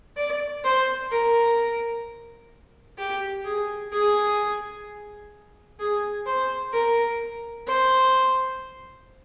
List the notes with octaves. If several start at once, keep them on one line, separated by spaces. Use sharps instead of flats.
D5
C5
A#4
G4
G#4
G#4
G#4
C5
A#4
C5